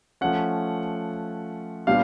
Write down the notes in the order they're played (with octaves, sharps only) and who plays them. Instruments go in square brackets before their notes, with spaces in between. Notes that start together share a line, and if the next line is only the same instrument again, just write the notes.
[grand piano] F3 A3 C#4 F#5
A#2 G3 B3 D4 F5